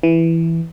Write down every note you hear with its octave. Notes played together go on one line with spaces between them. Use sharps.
E3